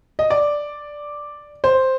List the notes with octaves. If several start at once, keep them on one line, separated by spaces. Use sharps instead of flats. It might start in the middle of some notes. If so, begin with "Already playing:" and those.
D#5
D5
C5